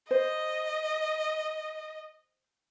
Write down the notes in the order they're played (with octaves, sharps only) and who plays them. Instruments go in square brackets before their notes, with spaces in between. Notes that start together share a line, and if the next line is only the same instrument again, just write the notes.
[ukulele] C5 [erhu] D#5